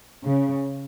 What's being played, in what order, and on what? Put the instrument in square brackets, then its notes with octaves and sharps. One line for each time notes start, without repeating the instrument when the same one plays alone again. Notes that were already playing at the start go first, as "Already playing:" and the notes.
[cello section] C#3